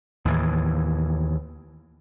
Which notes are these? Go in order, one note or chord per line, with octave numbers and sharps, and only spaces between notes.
D#2 A2 E3